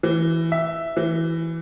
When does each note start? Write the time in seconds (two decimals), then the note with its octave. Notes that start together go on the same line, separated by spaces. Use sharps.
0.03 E3
0.52 E5
0.97 E3